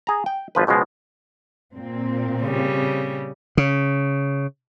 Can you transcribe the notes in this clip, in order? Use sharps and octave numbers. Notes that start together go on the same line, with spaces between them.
G#4 A#5
G5
G#1 F3 B4
C#2 B2 F3 G#3
A#2 C4
C#3 G3
C#3